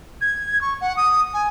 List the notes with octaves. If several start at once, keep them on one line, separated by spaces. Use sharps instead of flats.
G#6
C#6
F#5
D#6
G#5